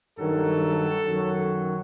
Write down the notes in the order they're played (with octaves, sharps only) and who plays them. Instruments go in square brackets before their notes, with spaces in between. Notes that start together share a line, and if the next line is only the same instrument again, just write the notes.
[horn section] G2 D#3 F#3 A4
F#2 D#3 F#3